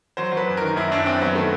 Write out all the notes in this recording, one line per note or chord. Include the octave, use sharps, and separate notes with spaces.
F#3 C5
F#3
B4
F#2
D#3 A#4
F#2 E4
F#2 D4
F#2 C4
F#3 B3
D#3 A3